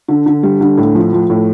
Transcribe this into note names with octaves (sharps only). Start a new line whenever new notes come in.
D3
D3
G3
D3
A2
F3
F3
A2